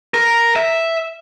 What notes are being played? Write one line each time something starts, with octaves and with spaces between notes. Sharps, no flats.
A#4
E5